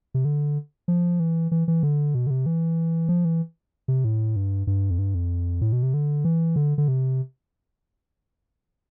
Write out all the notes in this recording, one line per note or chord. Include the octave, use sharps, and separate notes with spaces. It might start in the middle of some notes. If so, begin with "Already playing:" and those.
C3
D3
F3
E3
E3
E3
D3
B2
D3
C3
E3
F3
E3
C3
A2
G2
G2
F2
G2
F2
A2
B2
C3
D3
E3
D3
D3
C3